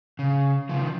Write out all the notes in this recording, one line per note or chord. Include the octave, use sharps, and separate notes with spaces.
C#3
C#3 F3
D#3